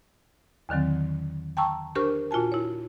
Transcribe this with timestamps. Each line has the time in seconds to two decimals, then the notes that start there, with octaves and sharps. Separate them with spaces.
0.69 E2 D3 D#3 F#3 C4
1.57 G5 A5 A#5 C#6 E6
1.95 D4 G4 A#4 C5 C#6 F6
2.31 A#2 F4 F#4 G#5 A5
2.52 E4 C#5